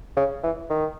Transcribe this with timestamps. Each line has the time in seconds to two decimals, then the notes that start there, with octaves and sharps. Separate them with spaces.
0.16 C#3
0.43 E3
0.70 D#3